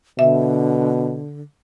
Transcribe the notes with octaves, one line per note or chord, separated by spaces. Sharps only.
B2 D3 E5